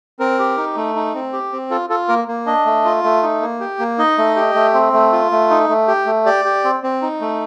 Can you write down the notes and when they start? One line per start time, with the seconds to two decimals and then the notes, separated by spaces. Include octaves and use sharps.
0.19 C4 A#4
0.39 G4
0.57 D#4
0.76 A3
0.96 D#4
1.14 C4
1.33 G4
1.52 C4
1.71 F4 A4
1.90 F4 A4
2.09 A#3 A#4
2.28 A#3
2.46 D4 D#5
2.66 A3
2.85 F4
3.04 A3
3.23 D#4
3.42 A#3
3.60 G4
3.79 A#3
3.98 D#4 D#5
4.18 A3
4.36 G4
4.55 A3
4.74 C4
4.93 A3
5.12 F4
5.32 A3
5.50 D#4
5.69 A3
5.88 G4
6.07 A3
6.26 G4 D5
6.45 G4
6.64 C4
6.83 C4
7.02 D#4
7.21 A3